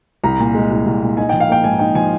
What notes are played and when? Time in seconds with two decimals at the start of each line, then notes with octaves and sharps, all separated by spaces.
0.23 C2 A#5
0.39 A#2
0.55 G#3
0.71 C2
0.86 C2
1.02 A#2
1.17 D#4 G#5
1.29 F3 G5
1.40 F5
1.49 A#3 G5
1.64 G#2 G#5
1.79 D#4 G5
1.95 F3 G#5